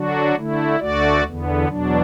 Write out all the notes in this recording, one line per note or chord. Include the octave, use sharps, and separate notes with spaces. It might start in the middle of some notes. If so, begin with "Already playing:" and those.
Already playing: D3 F#3 D4 F#4
D3 A3 E4
D2 D3 A3 F#4 D5
E2 D3 B3
E2 B2 F#3 D4